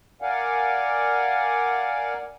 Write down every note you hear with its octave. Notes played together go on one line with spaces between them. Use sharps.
A#4 D5 F5 F#5 G#5